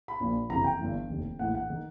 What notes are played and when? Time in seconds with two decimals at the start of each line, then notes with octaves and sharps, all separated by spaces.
0.08 B5
0.20 A#1 A#2 F3
0.49 F#1 F2 C3 E3 A#5
0.64 G5
0.79 G1 G2 E3
1.09 F1 D#2 D#3
1.39 A#1 A2 E3 F#5
1.55 F#5
1.70 D#3